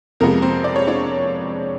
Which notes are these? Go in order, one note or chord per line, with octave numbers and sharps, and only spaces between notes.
F2 C3 F3 G#3 B3 A#4
C4 C5
D5
C#5
D4 D5